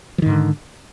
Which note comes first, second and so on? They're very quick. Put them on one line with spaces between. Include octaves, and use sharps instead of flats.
F3 D#3 G#2 D3